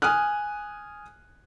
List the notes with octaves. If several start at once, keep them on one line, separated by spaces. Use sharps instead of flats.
G#5 D#6 F6 F#6